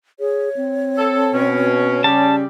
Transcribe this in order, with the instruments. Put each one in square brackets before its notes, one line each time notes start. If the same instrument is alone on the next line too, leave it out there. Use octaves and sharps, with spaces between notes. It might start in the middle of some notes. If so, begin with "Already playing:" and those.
[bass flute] G#4 [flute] C#5
[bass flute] C4
[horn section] A4
B2 C#4
[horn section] C#3 G3 [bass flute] C#4 [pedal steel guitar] A5